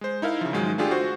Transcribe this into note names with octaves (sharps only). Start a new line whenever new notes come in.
G#3 C5
D#4 E4 A#4 F5
C#3 F3
G#2 D#3 F#3 G#3
A3 D4 F4 G4 G#4
F#4 C5